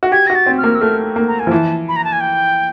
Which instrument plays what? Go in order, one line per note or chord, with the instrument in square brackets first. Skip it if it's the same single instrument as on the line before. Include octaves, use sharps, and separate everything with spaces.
[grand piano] F#4
[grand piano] G4 [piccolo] G#6
[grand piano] F#4 [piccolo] A#6
[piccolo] A6
[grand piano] C4
[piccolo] F6
[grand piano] A#3
[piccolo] E6
[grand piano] A3 [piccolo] F6
[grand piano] A#3
[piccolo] A#5
G#5
[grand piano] F3
[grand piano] E3 [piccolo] A5
[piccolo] B5
A#5
A5
G#5
G5